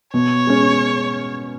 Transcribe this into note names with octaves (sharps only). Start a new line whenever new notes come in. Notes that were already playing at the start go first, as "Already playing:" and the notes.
B2 C#5
G#3 C#4